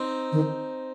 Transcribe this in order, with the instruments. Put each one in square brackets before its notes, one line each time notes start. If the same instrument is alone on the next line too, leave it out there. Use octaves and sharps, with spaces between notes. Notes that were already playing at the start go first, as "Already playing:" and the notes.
Already playing: [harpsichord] C4 D#4
[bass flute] D#3